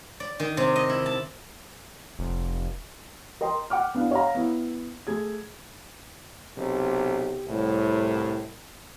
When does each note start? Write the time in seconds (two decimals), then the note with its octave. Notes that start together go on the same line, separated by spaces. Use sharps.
0.20 D5
0.40 D#3
0.57 C3
0.76 D#5
0.90 E4
1.06 A5
2.19 F1
3.41 A#4 D#5 G5 C6
3.70 F#5 G5 D6 F6
3.94 B3 D4 E4 F5
4.11 C#5 D#5 F5 F#5 A#5
4.35 B3 E4
5.07 A3 G#4 G#6
6.57 B1 C3 G4
7.46 C2 A2